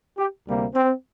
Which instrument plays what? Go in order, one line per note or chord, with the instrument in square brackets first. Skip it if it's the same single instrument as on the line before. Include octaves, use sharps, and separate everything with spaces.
[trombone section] G4
D2 C3 G3 A#3
C4